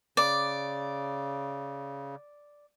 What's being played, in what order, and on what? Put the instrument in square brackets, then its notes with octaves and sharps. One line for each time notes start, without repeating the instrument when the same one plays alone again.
[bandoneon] C#3 [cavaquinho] D5